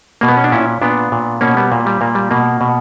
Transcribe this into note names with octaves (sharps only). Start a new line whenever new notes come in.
B2 A#3
B3
C#4
D4
A#2 C#4 E4
A#2 B3 D4
A#2
B2 A#3 C#4
G3 B3
A#2 A#3
G3
A#2 A#3
G3
B2 A#3
B2